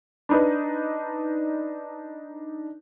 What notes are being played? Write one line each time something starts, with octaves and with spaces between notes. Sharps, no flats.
D4 D#4 B4